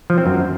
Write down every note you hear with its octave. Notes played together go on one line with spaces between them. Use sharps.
F3
C4
F#2